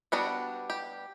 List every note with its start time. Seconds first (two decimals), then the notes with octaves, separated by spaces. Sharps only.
0.12 G3 B3 D4 F#4
0.70 G4